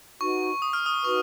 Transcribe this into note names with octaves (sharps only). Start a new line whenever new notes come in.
D#4 F#4 B4 C#6
D#6
F6
D#6
D#4 F#4 B4 C#6